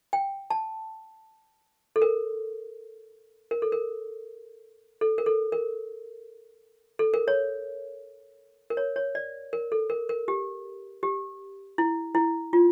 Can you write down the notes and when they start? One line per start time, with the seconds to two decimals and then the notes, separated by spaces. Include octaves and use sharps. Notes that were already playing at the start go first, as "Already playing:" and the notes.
0.13 G5
0.50 A5
1.96 A4
2.02 A#4
3.51 A#4
3.62 A4
3.72 A#4
5.01 A4
5.18 A#4
5.26 A4
5.52 A#4
6.99 A4
7.14 A#4
7.28 C#5
8.70 A#4
8.77 C#5
8.96 C#5
9.15 D5
9.53 A#4
9.72 A4
9.90 A#4
10.09 A#4
10.28 G4
11.03 G4
11.78 E4
12.15 E4
12.53 F4